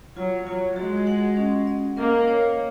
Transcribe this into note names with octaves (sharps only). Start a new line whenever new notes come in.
F#3 F4
F#3 F4
G#3 F#4
F#5
C#4
D#5
A#3 A#4
C#5